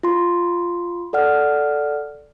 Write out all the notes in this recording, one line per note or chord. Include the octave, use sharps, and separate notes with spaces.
F4 C6
A4 D5 F#5 F6